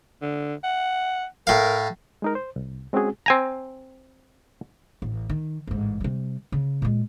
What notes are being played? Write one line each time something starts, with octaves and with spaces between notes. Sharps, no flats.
D3
F#5
A2 A#4 F5
G#3 D#4 A#4
C5
C2
G#3 C4 C#4 F#4 G#4
C4 G#5 A#5
A1
D#3
A1 G#2
C3 G3
C#3
A#2 G#3